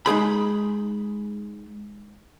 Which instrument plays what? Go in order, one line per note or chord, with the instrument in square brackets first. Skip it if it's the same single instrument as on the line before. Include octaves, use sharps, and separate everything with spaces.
[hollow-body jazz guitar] G#3 D#4 G#4 B5